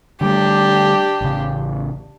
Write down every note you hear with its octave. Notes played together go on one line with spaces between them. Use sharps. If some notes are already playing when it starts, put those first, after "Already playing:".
D3 G3 A3 D4 G4
A1 C#3